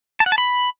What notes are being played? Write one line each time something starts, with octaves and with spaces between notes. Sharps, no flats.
A5
F#5
A5
B5